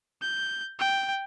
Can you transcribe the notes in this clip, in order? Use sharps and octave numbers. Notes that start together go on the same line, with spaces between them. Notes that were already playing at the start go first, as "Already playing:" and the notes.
G6
G5